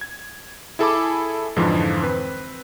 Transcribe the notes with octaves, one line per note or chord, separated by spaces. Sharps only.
G#6
E4 G#4 A4 G#5 B5 D6
F2 G#2 D3 E3 F3
C4 B4